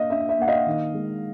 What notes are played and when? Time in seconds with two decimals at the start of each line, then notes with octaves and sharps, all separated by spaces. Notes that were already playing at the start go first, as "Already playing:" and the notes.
Already playing: A#3 D4 D#5 F5
0.10 D4 E5
0.29 E5
0.39 A#3 F#5
0.48 D#5 F5
0.66 D#3
0.94 G#3